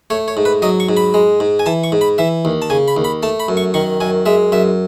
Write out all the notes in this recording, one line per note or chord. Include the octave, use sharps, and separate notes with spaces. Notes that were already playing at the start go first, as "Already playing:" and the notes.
A3 C#5
C#5
G#2
B4
F#3 D#5
C#6
G#2
B5
G#3
G#2
G#5
E3 A5
C#6
G#2
B5
E3 E5
D#2
A5
C#3 G#5
B5
D#2
B5
A3 A5
B5
F#2
C#6
D#3 C#6
F#2 G#5
G#3 E5
F#2 E5